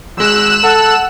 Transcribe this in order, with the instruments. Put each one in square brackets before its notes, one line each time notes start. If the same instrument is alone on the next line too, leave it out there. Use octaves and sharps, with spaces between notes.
[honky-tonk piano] G#1 G#3 [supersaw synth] E6 F#6 E7
[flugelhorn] A4 [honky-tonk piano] F#5